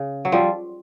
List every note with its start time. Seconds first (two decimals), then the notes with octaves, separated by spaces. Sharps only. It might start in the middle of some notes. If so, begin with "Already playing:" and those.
Already playing: C#3
0.25 F#3
0.32 F3 G3